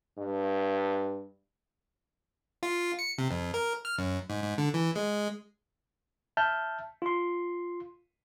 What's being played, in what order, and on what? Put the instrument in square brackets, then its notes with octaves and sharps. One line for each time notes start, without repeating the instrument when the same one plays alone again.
[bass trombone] G2
[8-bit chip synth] F4
C#7
C3
F2
A#4
F6
F#2
G#2
G#2
D3
E3
G#3
[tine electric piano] E5 A5 F6 G6
F4 C6